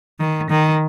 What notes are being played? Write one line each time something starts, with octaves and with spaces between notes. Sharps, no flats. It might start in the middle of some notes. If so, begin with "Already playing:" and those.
D#3
D#3